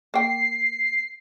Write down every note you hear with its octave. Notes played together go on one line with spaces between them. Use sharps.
A#3 G5 C7